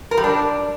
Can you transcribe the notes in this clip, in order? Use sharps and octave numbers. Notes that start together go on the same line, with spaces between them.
A#4
G3
D4